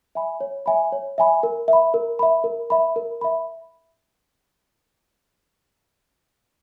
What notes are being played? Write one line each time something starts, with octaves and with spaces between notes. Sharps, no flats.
E5 G#5 B5
C#5
E5 G#5 B5
C#5
E5 G#5 B5
A#4
E5
B5
A#4
E5 B5
A#4
E5 B5
A#4
E5 B5